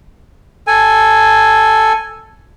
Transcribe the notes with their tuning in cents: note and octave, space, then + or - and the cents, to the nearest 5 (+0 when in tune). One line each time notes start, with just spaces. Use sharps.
A4 +0 G#5 +0